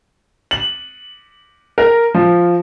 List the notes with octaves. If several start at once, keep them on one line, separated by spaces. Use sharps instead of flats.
F#7
A#4
F3